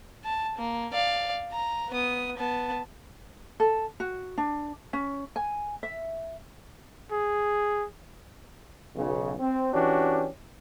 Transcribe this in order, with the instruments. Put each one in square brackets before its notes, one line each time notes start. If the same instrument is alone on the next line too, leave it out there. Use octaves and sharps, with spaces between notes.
[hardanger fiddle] A5
A#3
D5 F5
A#5
B3 D#6
B3 A5
[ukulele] A4
F#4
D4
C#4
G#5
E5
[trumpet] G#4
[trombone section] B1 C#3
C4
E3 C#4 D4 F#4 G4